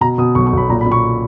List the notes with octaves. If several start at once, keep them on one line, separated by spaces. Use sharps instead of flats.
B2 A#5
B2 D#6
B1 C#6
C#6
B1 B5
A#2 A#5
B5
A#2
C#6